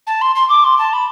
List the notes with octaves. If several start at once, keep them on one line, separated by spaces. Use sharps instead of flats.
A5
C6
C6
D6
C6
A5
B5